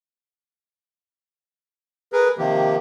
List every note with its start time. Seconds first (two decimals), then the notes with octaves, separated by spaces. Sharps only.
2.13 G#4 A#4 B4
2.38 C3 D#3 F3 A#3 G4